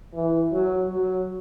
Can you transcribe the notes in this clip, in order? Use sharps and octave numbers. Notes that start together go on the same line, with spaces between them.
E3
F#3
F#3